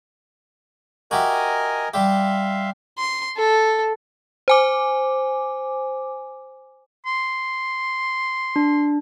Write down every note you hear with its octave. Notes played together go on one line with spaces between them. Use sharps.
F#4 G4 A#4 D#5 E5 G#5
G3 G4 E5 F5 C6
C6
A4
C5 G#5 D6
C6
D4